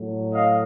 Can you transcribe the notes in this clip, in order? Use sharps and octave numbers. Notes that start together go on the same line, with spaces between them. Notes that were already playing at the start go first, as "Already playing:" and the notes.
Already playing: A2 F#3 A3
D#5 F5